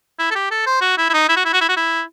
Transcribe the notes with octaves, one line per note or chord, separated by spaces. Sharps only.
E4
A4
G4
A4
C5
F#4
E4
E4
D#4
E4
F#4
E4
F#4
E4
F#4
E4